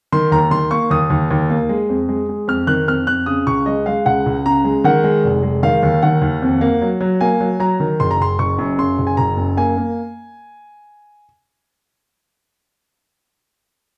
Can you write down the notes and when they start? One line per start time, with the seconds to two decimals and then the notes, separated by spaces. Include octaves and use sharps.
0.12 D#3 C6
0.32 D#2 A#5
0.51 D#3 C6
0.71 A#3 C#6
0.90 D#2 D#6
1.10 D#2
1.31 D#2
1.50 A#3
1.69 G#3
1.89 F2
2.09 G#3
2.29 G#3
2.48 F2 F6
2.67 D#3 F#6
2.88 F2 F6
3.07 F2 F#6
3.26 C#3 D#6
3.47 C#2 C#6
3.66 G#3 D#5
3.86 G#3 F5
4.06 C#2 F#5
4.26 C#2
4.45 C#3 A#5
4.65 G#3
4.84 D#3 F#5
5.04 G#3
5.24 F1
5.43 G#3
5.63 D#3 F5
5.83 D#2
6.03 D#3 F#5
6.22 D#2
6.42 F2
6.61 A#3
6.82 F#3
7.01 F#3
7.21 A#3 G#5
7.40 F#3
7.60 F#3 A#5
7.80 D#3
8.00 F#1 C6
8.11 A#5
8.19 F#1 C6
8.39 F#1 C#6
8.58 F#2
8.78 C#3 C6
8.98 F#1
9.07 G#5
9.17 F#1 A#5
9.37 F#2
9.57 A#3 G#5
9.77 A#3